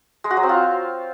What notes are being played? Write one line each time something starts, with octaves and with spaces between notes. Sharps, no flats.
G#3
F#4
F#3
C4
F4